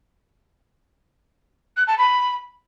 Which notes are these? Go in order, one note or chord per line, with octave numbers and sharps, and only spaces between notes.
F#6
A5
B5